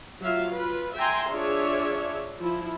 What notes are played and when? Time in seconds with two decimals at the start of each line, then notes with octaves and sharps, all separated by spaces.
0.20 F#3 F4 E5 F5
0.52 F4 B4
0.95 E5 G5 G#5 A#5 C6
1.29 D4 F4 G#4 C#5 D5 E5
2.40 F3 E4 F4